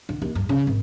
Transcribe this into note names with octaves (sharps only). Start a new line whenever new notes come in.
D3
D#2
G2
C#3
G#1